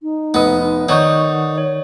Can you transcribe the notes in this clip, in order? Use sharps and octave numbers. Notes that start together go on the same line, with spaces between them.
D#4
F1 B3 D#5 D#6
D#4
D#3 D#4 C#5 D5 F#5 C#6 D#6 G6
C#5